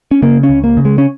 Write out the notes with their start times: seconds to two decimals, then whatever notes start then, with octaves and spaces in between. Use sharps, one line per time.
0.11 C#4
0.22 C#3 A#3
0.43 C#4
0.49 C#2
0.64 A#3
0.77 C#3
0.85 G#3
0.98 C#4